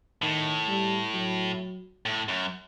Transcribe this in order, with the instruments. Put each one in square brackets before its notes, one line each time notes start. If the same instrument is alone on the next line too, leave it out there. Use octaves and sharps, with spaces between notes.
[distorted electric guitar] A2 [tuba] D#3
[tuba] G3
F#3
[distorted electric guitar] A2
F#2